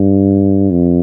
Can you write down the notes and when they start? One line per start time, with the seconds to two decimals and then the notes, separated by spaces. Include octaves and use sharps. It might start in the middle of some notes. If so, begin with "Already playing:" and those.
Already playing: G2
0.71 F2